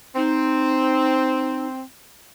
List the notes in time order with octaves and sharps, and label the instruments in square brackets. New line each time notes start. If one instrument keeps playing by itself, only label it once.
[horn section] C4 [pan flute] D#4